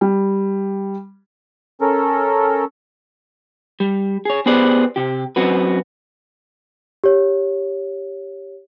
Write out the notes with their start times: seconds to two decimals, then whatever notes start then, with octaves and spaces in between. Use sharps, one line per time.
0.01 G3
1.81 C#4 A4 A#4
3.80 G3
4.25 G#4 C#5
4.46 B3 G4 G#4 B4 C5 D5
4.96 C3 G4
5.36 F#2 C4 F#4 B4
7.04 G4 C#5